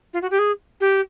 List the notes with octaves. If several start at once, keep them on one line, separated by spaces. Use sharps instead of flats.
F4
F#4
G4
G#4
G4